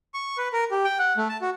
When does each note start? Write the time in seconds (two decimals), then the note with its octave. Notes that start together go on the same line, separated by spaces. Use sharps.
0.14 C#6
0.38 B4
0.53 A#4
0.71 G4
0.85 G5
0.99 F#5
1.17 A3
1.29 A5
1.41 F#4